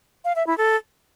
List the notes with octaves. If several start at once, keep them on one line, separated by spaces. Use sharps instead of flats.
F5
E5
E4
A4